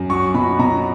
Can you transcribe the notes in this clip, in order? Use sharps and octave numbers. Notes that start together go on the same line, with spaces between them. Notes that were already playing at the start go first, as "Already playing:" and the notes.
Already playing: F#2
F#3 C#6
B2 B5
B2 A#5